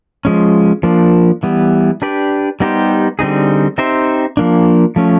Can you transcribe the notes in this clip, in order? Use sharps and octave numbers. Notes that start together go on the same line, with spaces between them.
F3 G#3 C#4
F3 A#3 D4
E3 G3 B3
D4 G4 B4 D5
G3 B3 D#4 G4 C5
D3 G3 C4 D#4 G#4
C4 D#4 G4 C5 E5
F3 A#3 D4
F3 A3 C#4